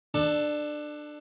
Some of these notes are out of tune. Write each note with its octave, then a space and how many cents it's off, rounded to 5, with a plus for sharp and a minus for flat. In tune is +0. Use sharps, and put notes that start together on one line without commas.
D4 +20 A4 +0